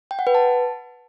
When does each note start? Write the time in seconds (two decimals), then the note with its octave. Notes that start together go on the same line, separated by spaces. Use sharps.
0.11 G5
0.19 F#5
0.27 B4
0.35 A5